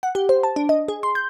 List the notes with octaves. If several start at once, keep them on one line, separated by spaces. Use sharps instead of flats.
F#5
G4
C5
A5
D4
D#5
G#4
C6
G6